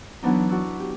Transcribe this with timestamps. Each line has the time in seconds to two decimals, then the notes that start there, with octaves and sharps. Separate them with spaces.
0.22 E3 F#3 B3 D4 D#4
0.49 D4 E4 F#4 D5
0.80 G4